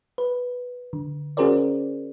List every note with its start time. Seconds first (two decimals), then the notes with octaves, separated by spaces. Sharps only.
0.18 B4
0.93 D3
1.37 C#4 F#4 G#4 A#4 C5 D5